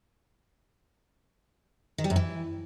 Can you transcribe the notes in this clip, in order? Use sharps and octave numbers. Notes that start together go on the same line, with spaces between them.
D#3
G3
F#2
E3